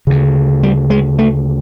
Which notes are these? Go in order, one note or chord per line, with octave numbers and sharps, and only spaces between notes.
D2 C#3
G3
G#3
A3